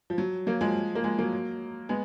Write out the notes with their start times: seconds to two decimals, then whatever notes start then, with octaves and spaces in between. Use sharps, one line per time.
0.10 F3
0.18 F#3
0.47 F#3 A#3
0.61 F3 G#3
0.95 A#3
1.04 F3 G#3
1.18 F#3 A#3
1.89 G#3 B3